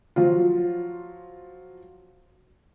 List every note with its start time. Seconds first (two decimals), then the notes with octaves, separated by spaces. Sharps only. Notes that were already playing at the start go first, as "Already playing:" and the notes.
0.16 F3 F#3 F4